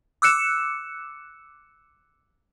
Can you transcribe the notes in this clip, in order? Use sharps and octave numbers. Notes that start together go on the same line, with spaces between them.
D6 E6 F#6 C#7 E7